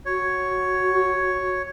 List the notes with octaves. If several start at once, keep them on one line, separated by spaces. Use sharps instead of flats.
F#4 C#5